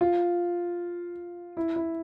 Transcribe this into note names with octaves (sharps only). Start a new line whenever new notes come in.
F4
E4
E4